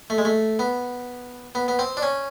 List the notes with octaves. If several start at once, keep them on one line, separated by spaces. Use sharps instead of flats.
A3
G#3
A3
B3
B3
B3
C4
D4
C#4